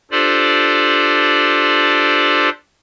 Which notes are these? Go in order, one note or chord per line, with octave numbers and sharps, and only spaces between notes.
D4 F4 G4 A4 C5 D5